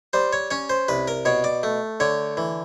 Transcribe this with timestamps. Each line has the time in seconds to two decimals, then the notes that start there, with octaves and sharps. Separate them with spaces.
0.13 G3 C5
0.33 C#5
0.51 C#4 C#5
0.70 C5
0.88 C2 B4
1.08 A#4
1.25 B2 C#5
1.44 D5
1.63 A3
2.00 D3 C#5
2.37 E3